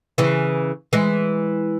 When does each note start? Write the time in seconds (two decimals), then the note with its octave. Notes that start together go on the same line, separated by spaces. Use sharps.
0.18 C#3 E3
0.93 E3 G#3